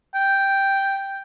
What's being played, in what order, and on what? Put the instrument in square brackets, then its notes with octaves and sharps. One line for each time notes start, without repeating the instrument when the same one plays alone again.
[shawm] G5